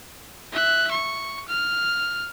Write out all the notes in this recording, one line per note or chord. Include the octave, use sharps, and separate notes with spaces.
E5 F#6
C#6
F6